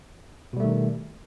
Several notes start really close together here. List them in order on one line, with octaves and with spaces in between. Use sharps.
B2 G3 A3 D#3